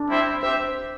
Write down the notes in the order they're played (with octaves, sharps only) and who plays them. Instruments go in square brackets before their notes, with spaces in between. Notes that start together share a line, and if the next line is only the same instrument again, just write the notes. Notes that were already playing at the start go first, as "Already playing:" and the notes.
Already playing: [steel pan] D4
[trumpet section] G3 C4 E4 C5 E5
[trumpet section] C4 G4 E5 [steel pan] C5